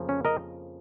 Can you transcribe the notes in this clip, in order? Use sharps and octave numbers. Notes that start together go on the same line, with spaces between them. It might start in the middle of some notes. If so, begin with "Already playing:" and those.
Already playing: F2 C#3 F3 A#3
C#4
A#4 D#5